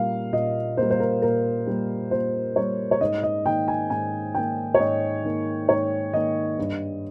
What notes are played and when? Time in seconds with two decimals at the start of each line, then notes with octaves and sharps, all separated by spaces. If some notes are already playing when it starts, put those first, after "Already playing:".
Already playing: A#2 G3 A#3 F5
0.33 A#2 D#5
0.77 G3 A#3 C5
0.90 C5
1.00 A#4
1.22 A#2 A#4
1.67 G3 A#3
2.11 A#2 C5
2.56 G3 A#3 C#5
2.91 C#5
3.01 G#2 D#5
3.23 D#5
3.45 D#3 A#3 G5
3.68 G#5
3.90 G#2 G#5
4.35 D#3 A#3 G5
4.74 C#5
4.79 G#2 D#5
5.24 D#3 A#3
5.69 G#2 C#5
6.13 D#3 A#3 D#5
6.58 G2